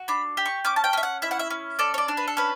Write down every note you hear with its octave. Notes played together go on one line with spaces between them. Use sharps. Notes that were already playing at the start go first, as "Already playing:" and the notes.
Already playing: F#4
D4 B5
G4
C#6
C#4 D6
A5
G5
C#4 E5
F#5
E4 E5
F#5
E5
C#4
A4 D5
C#5
D5
D4
B4
A4
C#4 B4